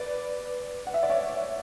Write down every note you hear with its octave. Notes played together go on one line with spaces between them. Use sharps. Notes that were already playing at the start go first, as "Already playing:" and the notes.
Already playing: B4 D5
F#5
E5
D5
C#5 E5